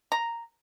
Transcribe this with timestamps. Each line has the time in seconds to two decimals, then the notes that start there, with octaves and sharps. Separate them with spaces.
0.12 A#5